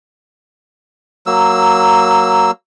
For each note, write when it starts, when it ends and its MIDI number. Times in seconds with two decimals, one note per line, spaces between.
1.27 2.51 54
1.27 2.51 58
1.27 2.51 88